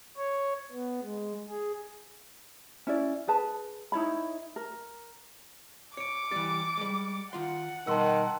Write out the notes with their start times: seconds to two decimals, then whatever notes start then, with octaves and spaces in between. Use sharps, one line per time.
0.17 C#5
0.72 B3
1.03 G#3
1.49 G#4
2.87 C#4 E4 D5
3.28 G#4 B4 A5
3.92 D#4 E4 C#5 B5
4.56 A#4
5.97 C#5 D6 C#7 D7
6.31 E3 G3 A6
6.77 G3 G#3
7.33 D#3 F4 F#5 C6
7.87 B2 D#3 G3 A5 C6 E6